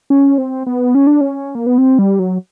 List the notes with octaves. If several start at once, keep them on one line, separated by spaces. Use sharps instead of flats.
C#4
C4
B3
C#4
D4
C#4
A#3
B3
C4
G3
F#3